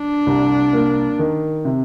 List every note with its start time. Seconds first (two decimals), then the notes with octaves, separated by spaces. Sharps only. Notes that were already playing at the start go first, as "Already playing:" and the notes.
Already playing: D4
0.27 C2
0.73 A#3
1.19 D#3
1.65 C3